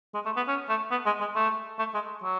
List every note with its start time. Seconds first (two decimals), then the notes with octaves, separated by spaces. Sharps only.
0.14 G#3
0.26 A3
0.37 B3
0.48 C#4
0.69 A3
0.91 B3
1.06 G#3
1.21 G#3
1.36 A3
1.79 A3
1.94 G#3
2.23 F#3